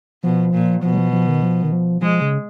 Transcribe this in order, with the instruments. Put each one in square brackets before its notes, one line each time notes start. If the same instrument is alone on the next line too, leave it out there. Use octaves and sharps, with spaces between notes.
[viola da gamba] B2 [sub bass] F3
[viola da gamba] A#2
[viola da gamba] B2 [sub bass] F3
[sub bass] F#3
F3
F3
D#3
F3
D#3
F3
[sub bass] F3 [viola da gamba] G#3
[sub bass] C#3